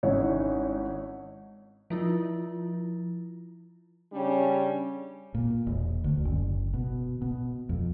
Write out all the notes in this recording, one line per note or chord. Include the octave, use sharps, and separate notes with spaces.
G#1 C#4 D#4 E4 C#5
F3 E4 F4
C#3 G3 C#4 D4
A#2
E1
D2
F#1
B2
B2
F2